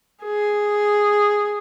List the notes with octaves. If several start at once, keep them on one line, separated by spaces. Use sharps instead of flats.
G#4